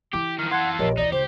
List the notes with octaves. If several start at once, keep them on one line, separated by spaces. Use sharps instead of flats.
E3 G4 D6
D#3 F3 F6
F4 A4 F#5 C6 F#6 G#6
A#1 F3 G4 A#4 C#5 D#5
D2 E3 D#4 D5 F7
C#2 G4 C5